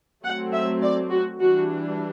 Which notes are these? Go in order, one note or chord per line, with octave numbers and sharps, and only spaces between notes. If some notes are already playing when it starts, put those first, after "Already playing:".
F#3 A3 C4 F#5
E5
D5
F#4
E3 G3 D4 F#4